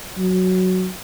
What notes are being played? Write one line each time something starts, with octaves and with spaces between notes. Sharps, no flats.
F#3